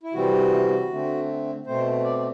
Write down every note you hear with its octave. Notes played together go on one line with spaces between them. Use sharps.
E4
C3 E3 G3 C4 F#4
D3 A3 C4
B2 A3 C4 C5
D5
D5